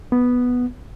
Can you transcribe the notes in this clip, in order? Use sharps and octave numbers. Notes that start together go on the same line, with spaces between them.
B3